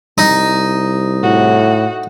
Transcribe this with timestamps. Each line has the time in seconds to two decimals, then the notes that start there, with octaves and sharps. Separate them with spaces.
0.18 C2 D#4
1.23 A2 F#4